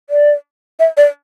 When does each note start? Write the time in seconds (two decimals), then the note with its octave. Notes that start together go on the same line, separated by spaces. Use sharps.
0.10 D5
0.80 E5
0.97 D5